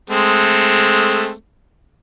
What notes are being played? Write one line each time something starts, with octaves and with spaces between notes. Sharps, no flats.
G#3 A3 C4